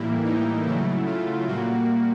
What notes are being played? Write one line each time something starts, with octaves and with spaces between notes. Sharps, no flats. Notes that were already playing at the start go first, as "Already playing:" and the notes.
Already playing: A2 E3 G3 A#3 E4
D#4
C#3 F#3 A3 E4
F4
A#2 G3 A#3 F#4